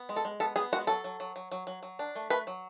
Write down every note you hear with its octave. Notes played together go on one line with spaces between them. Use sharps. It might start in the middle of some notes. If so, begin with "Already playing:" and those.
Already playing: B3
G#3
A4
G#3
B3 A4
B3 G#4
G#3 F#4
F#3 A4
F#3
F#3
F#3
F#3
F#3
F#3
D4
A3
A3 B4
F#3